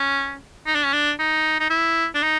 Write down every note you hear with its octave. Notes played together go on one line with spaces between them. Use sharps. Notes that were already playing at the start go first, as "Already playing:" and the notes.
Already playing: C#4
D#4
D4
C#4
D4
D#4
D#4
E4
D4
D#4